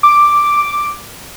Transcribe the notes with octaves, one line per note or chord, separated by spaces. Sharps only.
D6